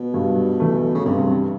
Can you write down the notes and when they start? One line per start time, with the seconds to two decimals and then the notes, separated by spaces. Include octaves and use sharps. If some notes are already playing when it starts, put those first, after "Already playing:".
Already playing: B2
0.14 G2
0.60 E3 A3
0.95 C#3
1.05 G2 C3